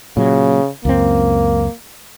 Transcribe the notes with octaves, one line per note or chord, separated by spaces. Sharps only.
A#2 C#3 F#3
C#2 F#2 A#3 C4